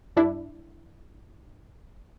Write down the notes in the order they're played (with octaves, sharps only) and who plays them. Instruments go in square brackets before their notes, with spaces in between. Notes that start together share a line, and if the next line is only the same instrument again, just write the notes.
[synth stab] G2 D4 E4